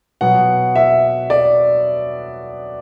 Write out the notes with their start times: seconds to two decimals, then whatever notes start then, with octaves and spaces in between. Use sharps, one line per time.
0.21 B2 F#3 B3 F#5
0.76 E5
1.30 D5